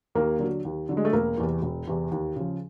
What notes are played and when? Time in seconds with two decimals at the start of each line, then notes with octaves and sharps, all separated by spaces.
0.15 D#2 A#3
0.39 D3 F#3
0.65 D#2
0.89 D3 F#3
0.97 G#3
1.05 A3
1.13 E1 A#3
1.37 E2 C3 E3
1.62 E1
1.87 E2 C3 E3
2.11 D#2
2.36 C#3 F3